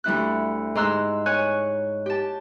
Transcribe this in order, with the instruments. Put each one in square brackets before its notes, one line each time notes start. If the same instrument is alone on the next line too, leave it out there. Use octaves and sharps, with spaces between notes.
[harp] D2 G3 E4 F#6
G#2 A#5 C6 E6 F#6
C#5 G#5 F#6
G4 A5